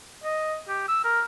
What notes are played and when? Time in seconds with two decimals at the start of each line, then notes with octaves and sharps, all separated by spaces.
0.24 D#5
0.68 G4
0.88 E6
1.04 A#4